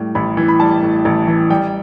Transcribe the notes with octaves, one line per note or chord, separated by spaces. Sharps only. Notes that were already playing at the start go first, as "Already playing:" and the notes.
Already playing: A2 G3
A1 B5
E3
B5
G3 A5
A2
A1
E3
G3 G5